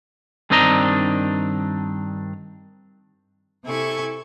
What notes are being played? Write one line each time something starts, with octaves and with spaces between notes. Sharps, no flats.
G2 D#3 C4 D4 D#5 A#5
C3 E4 A4 G#5 C#6